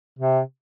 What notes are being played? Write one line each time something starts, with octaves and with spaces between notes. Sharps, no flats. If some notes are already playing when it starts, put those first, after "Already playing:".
C3